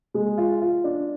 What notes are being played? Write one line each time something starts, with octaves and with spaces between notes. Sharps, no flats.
G#3
F4
F4
D4